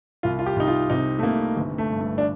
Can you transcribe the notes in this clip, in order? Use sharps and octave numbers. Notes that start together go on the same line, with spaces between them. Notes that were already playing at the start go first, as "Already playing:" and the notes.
C2 F4
F4
G4
C2 D#4
F4
C3 D#4
A3
C3 A#3
G1
A3
G2
A3
D4